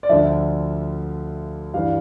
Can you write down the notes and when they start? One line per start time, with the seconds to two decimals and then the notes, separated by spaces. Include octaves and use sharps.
0.03 D5
0.09 D2 D3 F3 E5
1.74 G2 E3 F5